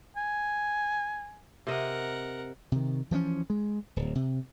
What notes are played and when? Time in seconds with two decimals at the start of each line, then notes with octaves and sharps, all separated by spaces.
0.17 G#5
1.67 C3 A#4 D#5 F#5
2.72 C3 D#3
3.11 E3 F3 G#3 C#4
3.50 G#3
3.96 D1
4.15 C3